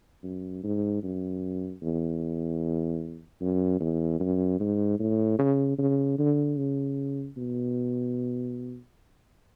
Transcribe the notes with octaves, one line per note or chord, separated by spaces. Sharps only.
F#2
G#2
F#2
E2
F#2
E2
F#2
G#2
A2
C#3
C#3
D3
C#3
B2